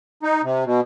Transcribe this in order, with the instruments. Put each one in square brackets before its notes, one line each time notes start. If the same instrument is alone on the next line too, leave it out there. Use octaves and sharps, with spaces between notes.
[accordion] D#4
C3
B2